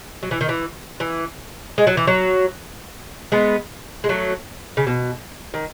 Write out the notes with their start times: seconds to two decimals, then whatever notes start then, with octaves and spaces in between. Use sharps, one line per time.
0.23 F#3
0.31 E3
0.41 D#3
0.49 E3
1.00 E3
1.78 G#3
1.87 F#3
1.97 E3
2.07 F#3
3.32 G#3 B3
4.04 G#3
4.09 F#3 A3
4.77 C#3
4.87 B2
5.54 D#3